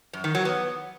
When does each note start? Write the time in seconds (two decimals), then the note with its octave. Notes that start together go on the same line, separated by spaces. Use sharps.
0.13 F#2
0.24 D#3
0.35 F#3
0.45 B3